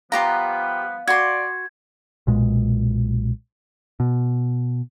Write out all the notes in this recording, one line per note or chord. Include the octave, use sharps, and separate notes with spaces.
F3 G3 B3 F4 G4 F5 A#5
F#4 D5 C6 G#6
B1 A#2 G#3
B2